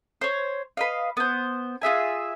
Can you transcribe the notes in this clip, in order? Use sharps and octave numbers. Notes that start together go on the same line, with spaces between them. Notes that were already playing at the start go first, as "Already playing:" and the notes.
C5 C#5
B4 D#5 F5
B3 C5
F4 G#4 E5 G#5